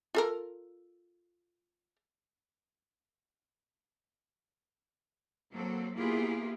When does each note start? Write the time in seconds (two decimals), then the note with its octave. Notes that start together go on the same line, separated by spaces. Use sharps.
0.15 F4 A4 A#4
5.52 F#3 A#3 C4 A4
5.95 A#3 B3 E4 F4 G4 G#4